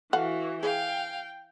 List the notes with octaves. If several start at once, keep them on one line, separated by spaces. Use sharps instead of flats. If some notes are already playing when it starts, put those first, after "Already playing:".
E3 F#4 A4 F5 F#5
G#4 F5 G5